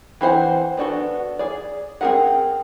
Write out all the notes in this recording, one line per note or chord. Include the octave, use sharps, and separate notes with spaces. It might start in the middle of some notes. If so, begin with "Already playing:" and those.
E3 C4 C5 F#5
B3 D4 F#4 A4
G#4 D5
C4 D4 G#4 A#4 F#5